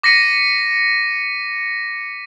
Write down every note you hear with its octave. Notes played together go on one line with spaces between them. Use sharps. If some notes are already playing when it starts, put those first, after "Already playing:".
D6 A#6 B6 C#7 D#7